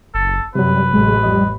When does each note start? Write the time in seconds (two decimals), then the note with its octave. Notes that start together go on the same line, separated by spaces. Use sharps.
0.14 F#1 A4
0.55 F#2 C3 F#3 G3 B4
0.93 A1 G#3
1.23 F2 G3 D#5